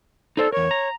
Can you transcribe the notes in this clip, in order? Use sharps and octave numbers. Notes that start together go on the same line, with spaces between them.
D#4 A4 C5 D5
E2 A#4 C#5
A#5